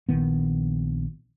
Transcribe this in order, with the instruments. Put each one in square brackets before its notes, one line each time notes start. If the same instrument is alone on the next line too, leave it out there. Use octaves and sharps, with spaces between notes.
[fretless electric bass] A#1 D#3 B3